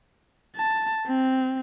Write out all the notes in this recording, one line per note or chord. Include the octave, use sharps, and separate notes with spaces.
A5
C4